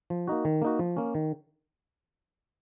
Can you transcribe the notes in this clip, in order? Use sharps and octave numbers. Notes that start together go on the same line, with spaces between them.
F3
A#3 D#4 F#4
D#3
A#3 D#4 F#4
F3
A#3 C#4
D#3